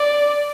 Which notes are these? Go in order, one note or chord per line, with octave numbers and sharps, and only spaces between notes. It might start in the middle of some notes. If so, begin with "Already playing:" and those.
Already playing: D5